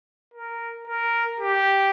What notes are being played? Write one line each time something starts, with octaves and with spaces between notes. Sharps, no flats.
A#4
A#4
G4